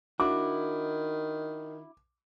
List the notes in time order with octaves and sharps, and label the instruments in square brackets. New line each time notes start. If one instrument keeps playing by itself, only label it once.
[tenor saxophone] D#3 [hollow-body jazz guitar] D4 E4 F#4 [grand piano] D6